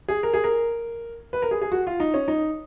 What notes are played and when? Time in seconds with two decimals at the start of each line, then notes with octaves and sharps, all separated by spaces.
0.08 G#4
0.23 A#4
0.34 G#4
0.44 A#4
1.33 B4
1.42 A#4
1.51 G#4
1.61 G#4
1.72 F#4
1.87 F4
2.00 D#4
2.14 C#4
2.28 D#4